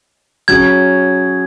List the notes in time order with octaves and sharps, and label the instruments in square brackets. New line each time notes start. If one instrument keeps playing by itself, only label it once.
[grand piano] F#3 C#4 G#4 [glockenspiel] G#6